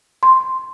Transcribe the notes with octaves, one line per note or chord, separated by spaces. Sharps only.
C6